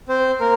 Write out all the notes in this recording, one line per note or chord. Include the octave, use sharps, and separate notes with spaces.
C4 C5
A#3 A#4